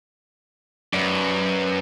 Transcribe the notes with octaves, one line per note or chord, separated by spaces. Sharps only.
F#2 B4 D5